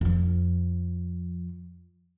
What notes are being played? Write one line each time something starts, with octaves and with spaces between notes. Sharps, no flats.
F2 F3